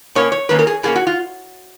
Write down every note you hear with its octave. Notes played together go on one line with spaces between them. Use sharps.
B2 A#3 C#4 C#5
C#5
D#3 A#3 C#4 B4
A#4
G#4
B2 A#3 C#4 G#4
F#4
F4